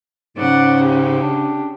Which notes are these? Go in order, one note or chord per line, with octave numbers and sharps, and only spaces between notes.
G#2 C#3 D5 F#5
G4
D4